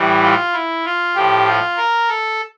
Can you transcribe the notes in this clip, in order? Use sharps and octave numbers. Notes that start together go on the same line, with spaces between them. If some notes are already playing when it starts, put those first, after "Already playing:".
Already playing: A2 E3 G3
F4
E4
F4
A2 F3 G4
F4
A#4
A4